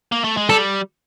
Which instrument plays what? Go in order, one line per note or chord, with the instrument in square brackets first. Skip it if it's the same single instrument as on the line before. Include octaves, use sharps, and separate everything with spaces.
[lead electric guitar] A#3
A3
G#3
[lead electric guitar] G3 [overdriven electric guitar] A4